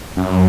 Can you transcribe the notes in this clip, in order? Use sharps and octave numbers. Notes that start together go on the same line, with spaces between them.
F#2